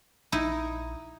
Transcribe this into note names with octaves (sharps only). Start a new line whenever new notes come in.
A#1 D#4 E4